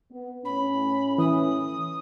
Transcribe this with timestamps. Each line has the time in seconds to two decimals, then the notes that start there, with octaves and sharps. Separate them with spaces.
0.12 B3
0.45 A2 C#4 B5
1.18 E3 D#6